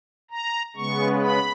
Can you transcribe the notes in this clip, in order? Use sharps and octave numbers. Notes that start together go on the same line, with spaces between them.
A#5
C#3 G#3 B3 C#6
B5